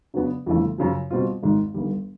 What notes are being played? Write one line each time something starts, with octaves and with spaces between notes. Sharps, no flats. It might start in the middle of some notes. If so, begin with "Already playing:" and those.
C#3 F#3 B3 D4
G1 F2 C#3 E3 A3
F#2 C#3 F3
B2 G3 C4 F4
G#1 G#2 D#3
G1 G2 D#3 G3